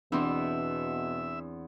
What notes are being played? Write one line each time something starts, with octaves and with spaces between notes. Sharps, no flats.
E2 B2 E3 C4 D4 E5